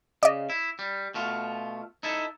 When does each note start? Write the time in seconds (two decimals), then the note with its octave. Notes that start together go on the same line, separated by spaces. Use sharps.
0.23 C#3 D5 D#5
0.50 E4
0.79 G3
1.14 B2 A3 F4
2.03 D#4 E4 A4